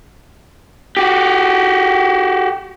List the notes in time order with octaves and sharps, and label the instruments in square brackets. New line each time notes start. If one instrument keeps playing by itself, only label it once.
[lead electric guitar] F#4 G4